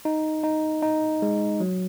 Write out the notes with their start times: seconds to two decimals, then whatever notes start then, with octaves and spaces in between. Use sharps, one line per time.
0.05 D#4
0.44 D#4
0.83 D#4
1.22 G#3
1.60 F#3